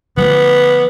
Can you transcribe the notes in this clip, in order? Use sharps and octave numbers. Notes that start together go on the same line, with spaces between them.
D3 F3 A3 B3